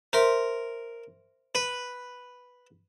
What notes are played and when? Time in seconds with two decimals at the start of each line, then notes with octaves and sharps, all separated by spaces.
0.13 A#4 C5 E5 C6
1.55 B4